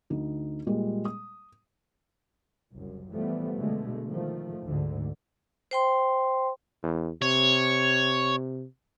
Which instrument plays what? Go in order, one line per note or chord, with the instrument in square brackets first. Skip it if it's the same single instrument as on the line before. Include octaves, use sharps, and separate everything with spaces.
[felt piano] D2 D#4
A#2 G3 G#3
D#6
[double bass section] F#1 C2 F#2
E3 F3 G3 A3 B3
B2 D3 G#3 A3
D#3 F3 A3
D2 G#2 D3
[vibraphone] C5 G5 C6
[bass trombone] E2
[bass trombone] C3 [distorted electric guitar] C#5